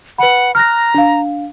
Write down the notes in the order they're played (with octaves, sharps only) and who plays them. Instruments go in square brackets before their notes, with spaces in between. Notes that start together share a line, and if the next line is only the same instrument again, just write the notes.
[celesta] B4 B5 [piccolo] F#5
[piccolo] A#5 [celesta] F6 F#6 A#6
[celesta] D4 F5